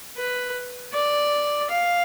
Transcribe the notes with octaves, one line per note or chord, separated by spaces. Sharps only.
B4
D5
F5